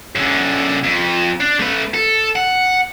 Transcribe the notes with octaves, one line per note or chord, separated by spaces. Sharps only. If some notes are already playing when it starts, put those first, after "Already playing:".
F#2 D3
F2
D4
A3 B4
A4
F#5